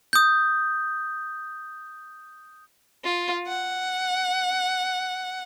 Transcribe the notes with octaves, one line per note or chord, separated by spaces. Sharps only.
D#6 G6
F4
F#5